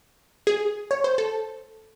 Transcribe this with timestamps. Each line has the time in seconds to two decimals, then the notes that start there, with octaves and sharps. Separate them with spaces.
0.47 G#4
0.91 C#5
1.04 C5
1.18 A4